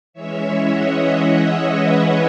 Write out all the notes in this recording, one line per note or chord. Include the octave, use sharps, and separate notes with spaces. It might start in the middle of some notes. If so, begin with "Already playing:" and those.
E3 G#3 C#4 C#5 E5
D#5 F#5
B4 D#5